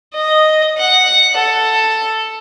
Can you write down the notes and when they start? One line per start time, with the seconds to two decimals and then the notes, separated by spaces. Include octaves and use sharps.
0.14 D#5
0.78 F#5
1.36 A4